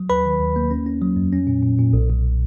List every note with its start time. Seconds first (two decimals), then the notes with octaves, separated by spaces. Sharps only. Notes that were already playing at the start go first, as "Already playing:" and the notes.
Already playing: F#3
0.10 D#2 B4 B5
0.26 D#3
0.40 D#2
0.56 A#3
0.71 C#4
0.86 C#4
1.02 F#3
1.16 F2
1.33 C#4
1.47 A#2
1.63 A#2
1.79 A#2
1.93 B1
2.10 B1